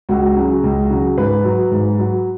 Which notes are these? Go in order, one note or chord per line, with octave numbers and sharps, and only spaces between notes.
C#2 F#4
C#3 F#3
C#2
C#3 F#3
G#2 B4
F#3
G#2
F#3